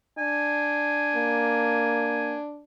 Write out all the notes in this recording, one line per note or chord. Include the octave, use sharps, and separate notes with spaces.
D4 G#5
A#3